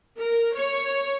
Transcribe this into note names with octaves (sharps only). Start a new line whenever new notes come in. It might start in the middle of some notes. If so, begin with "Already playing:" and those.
A#4
C#5